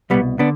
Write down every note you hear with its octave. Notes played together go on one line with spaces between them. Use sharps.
C2 B2 G3 B3
D3 B3 D4